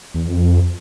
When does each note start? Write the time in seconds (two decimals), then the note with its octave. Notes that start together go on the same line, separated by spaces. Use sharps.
0.14 E2
0.27 F2